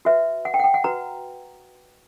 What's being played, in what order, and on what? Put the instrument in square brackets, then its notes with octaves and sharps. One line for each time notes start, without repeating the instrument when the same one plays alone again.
[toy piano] F#4 B4 E5
F#5
G5
F#5
G5
F#5
F#4 B4 A#5